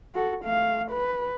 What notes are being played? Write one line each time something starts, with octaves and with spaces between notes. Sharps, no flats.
F#4 A4
A3 F5
B4